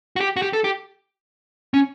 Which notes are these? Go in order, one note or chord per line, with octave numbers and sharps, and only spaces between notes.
F#4
G4
F#4
G4
A4
G4
C#4